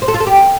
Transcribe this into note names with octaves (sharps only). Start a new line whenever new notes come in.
C5
A4
F4
A4
G4